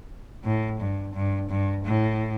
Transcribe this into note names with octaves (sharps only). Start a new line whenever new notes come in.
A2
G2
G2
G2
A2